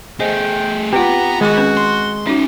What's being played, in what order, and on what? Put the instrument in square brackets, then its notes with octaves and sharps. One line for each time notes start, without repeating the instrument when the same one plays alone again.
[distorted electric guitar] A3 G#4 [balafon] C5 D#5 [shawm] G5
[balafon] C4 F4 [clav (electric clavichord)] G4 [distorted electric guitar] B4 F#5 [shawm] A#5
[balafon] D#3 D6 [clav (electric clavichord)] G#3 [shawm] F#4
[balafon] C4 C#4 B4
[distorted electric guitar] C6
[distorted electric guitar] C#4 E5 [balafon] D#4 F#4